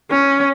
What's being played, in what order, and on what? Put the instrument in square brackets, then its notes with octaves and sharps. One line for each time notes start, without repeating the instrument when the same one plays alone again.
[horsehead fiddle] C#4